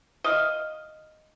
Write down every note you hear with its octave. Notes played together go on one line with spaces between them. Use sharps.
D#5 F5